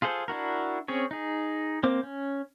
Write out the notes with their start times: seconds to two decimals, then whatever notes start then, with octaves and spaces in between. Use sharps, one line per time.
0.02 F4 G#4 A4 C5
0.28 D4 E4 F#4 A#4
0.88 C4 C#4 G#4 C#5
1.11 D#4 G#4
1.83 A#3 C4 C5 D6
2.03 C#4